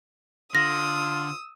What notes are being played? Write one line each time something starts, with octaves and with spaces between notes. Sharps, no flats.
D3 F4 D#6 E6 A#6